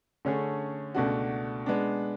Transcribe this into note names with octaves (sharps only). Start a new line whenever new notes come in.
D3 A3 C#4 G#4
C#2 B2 A3 D4 F#4
G#3 B3 D4